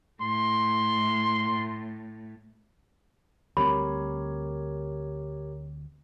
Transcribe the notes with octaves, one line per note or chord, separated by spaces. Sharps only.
A2 C6
D2 G3 C4 G4 A#4 C#5 B5